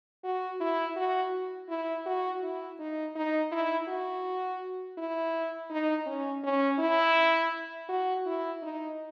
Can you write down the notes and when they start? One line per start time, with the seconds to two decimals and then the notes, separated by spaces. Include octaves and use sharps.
0.24 F#4
0.60 E4
0.97 F#4
1.69 E4
2.06 F#4
2.43 E4
2.80 D#4
3.15 D#4
3.52 E4
3.88 F#4
4.98 E4
5.70 D#4
6.06 C#4
6.44 C#4
6.79 E4
7.89 F#4
8.26 E4
8.62 D#4